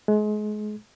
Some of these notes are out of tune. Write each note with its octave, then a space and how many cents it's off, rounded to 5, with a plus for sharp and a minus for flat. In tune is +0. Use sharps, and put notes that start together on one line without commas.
G#3 +30